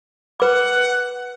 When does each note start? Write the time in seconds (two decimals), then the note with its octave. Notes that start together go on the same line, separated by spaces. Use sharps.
0.40 B4 F#5 D6